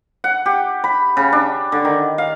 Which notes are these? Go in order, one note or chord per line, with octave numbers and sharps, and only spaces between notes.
F#5
G4
B5
C#3
D4
D3
D#3
F5